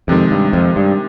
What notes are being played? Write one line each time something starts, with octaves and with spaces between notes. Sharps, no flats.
F2 C3 D#3 G#3
G2
F2
G2